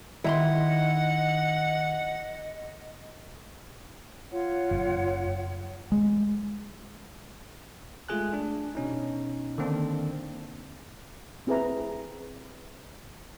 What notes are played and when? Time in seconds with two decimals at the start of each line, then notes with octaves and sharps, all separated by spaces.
0.24 D#3 E4 D#5 F#5 A#5 C6
4.32 F4 C#5 F#5
4.71 F#1
5.92 G#3
8.09 G#3 A3 F4 G#4 G#5 F#6
8.33 D4
8.75 B2 C#4 D#4
9.58 D3 D#3 A#3 C4 D4
11.47 C4 E4 G#4 B4 E5 A#5